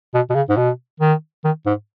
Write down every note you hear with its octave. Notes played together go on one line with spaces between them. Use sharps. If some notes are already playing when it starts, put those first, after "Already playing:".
B2
B2
C#3
G#2
B2
D#3
D#3
G#2